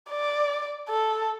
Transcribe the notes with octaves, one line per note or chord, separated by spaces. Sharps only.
D5
A4